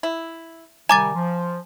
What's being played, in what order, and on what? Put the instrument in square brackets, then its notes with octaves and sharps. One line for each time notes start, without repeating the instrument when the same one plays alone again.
[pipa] E4
[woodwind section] C3 D#3 G3 [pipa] G#5 [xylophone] A#5 D6 A6
[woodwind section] F3